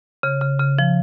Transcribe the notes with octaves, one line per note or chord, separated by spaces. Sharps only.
C#3
C#3
C#3
F3